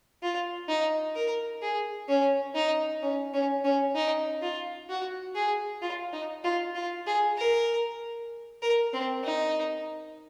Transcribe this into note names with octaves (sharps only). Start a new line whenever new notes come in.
F4
D#4
A#4
G#4
C#4
D#4
C#4
C#4
C#4
D#4
F4
F#4
G#4
F4
D#4
F4
F4
G#4
A#4
A#4
C4
D#4